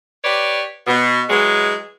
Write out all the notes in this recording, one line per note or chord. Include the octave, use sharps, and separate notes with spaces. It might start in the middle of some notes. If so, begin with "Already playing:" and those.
G4 B4 C#5 D5
B2
E3 F#3 G#3